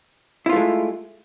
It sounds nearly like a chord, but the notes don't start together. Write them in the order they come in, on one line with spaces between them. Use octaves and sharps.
E4 F4 A3 G#3